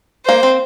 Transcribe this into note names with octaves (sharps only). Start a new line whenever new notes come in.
A#3 C5
C4